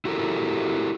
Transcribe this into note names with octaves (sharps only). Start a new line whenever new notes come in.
E4 F#4 G4 A4 A#4